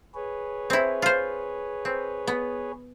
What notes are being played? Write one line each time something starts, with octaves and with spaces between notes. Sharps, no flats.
G#4 B4 C#5
C4 E4
F4 C5
C4
B3